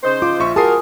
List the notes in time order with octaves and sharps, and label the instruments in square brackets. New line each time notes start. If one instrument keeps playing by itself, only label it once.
[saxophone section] C#3 D#4 C5
[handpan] F4 [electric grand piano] D6
[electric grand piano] A#1 E5 C#6
[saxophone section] F#4 A#4 [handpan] G#4 [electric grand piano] A5 D#6 C7